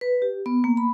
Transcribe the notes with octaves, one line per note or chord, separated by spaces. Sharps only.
B4
G4
B3
A#3
B5